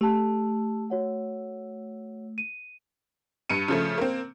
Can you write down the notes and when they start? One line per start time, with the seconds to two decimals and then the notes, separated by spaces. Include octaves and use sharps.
0.01 A3 G4 A5
0.90 F#4 C#5 F#5
2.38 D#7
3.50 G2 C#7 D#7
3.68 C#3 F3 A3
3.98 A#3 C4